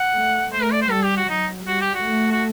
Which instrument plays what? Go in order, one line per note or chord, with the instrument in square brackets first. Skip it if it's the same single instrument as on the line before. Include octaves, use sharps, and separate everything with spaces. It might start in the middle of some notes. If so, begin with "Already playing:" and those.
Already playing: [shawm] F#5
[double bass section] A3
[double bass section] A3 [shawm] C5
[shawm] A#4
D5
C5
[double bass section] G3 [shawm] A4
[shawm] G4
F#4
[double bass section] F#3 [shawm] D#4
[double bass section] G3 [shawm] F#4
[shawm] G4
F#4
[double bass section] A3
[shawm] F#4